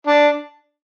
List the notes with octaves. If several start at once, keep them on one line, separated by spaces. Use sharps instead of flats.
D4